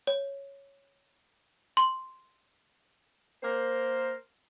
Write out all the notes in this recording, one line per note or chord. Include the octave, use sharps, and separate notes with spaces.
C#5
C6
A#3 A#4 C5